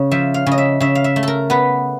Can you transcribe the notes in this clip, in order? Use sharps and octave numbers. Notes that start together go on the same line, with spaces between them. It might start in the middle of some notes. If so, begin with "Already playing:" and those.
Already playing: C#3
F3 E5
F5
C#3
D#5
E5
C#3 E5
F5
E5
A3
A4 A#4
B3 B4